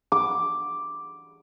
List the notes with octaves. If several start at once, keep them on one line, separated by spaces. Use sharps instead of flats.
D6